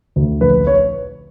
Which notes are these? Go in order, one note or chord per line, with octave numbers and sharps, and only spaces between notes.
D2
A#1 B4
C#5